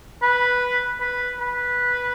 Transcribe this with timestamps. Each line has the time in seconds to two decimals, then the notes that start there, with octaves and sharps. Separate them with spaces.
0.22 B4
1.01 B4
1.40 B4